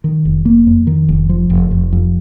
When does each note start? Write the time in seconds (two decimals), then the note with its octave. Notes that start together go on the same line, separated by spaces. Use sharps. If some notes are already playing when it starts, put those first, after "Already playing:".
0.04 D#3
0.25 F1
0.45 A#3
0.67 F2
0.87 D#3
1.09 F1
1.29 F3
1.50 F1
1.71 F1
1.93 F2